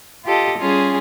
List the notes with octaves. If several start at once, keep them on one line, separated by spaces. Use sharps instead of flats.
F4 G4 A4 D#5
G3 C#4 F4 G#4